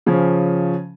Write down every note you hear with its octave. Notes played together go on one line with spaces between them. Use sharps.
C#3 F3 C#4